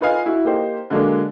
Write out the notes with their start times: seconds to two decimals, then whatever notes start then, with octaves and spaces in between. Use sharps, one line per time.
0.01 D#4 F4 B4 D#5 F5 G#5
0.26 E4 F#4
0.44 A#3 D#4 G4 C5
0.90 D3 F#3 G#3 A#3 D4